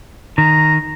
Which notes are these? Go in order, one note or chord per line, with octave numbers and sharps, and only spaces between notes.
D#3 A#5